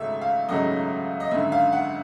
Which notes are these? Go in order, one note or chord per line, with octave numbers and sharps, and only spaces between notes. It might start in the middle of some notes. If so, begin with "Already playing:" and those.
Already playing: G#1 F#2 C#3 F#3 A3 E5
F5
G#1 F#2 C#3 F#3 A3 D#5
D#5
G#1 F#2 D3 E5
F5
F#5